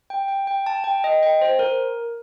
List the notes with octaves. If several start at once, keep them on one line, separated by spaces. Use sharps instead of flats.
G5
G5
G5
A5
G5
D#5
G5
C5
A#4